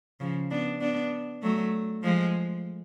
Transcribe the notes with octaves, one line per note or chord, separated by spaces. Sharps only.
C#3 F3
B3 D4
B3 D4
F#3 A3
F3 G#3